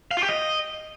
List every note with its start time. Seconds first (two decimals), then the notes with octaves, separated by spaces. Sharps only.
0.11 F5
0.17 F4
0.23 G4
0.29 D#5